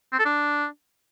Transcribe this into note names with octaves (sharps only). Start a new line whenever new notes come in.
C4
A4
D4